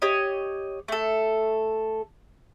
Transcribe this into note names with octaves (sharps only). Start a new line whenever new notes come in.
G4 C#5 D#5
A3 A4